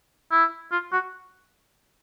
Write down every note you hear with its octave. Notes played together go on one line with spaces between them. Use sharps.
E4
F4
F#4